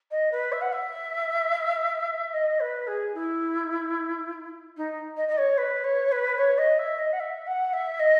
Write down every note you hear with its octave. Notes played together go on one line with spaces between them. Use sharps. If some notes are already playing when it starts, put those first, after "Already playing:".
D#5
B4
E5
F#5
E5
D#5
B4
G#4
E4
D#4
D#5
D#5
C#5
B4
C#5
B4
C#5
D#5
E5
D#5
F#5
E5
F#5
E5
D#5